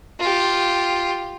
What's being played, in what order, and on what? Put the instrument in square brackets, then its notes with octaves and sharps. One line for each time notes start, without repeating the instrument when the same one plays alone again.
[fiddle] F4 G4